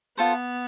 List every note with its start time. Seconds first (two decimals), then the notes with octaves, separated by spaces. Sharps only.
0.17 B3 F4 A4 C5